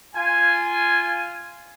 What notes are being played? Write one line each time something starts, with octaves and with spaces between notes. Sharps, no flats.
F4 G#5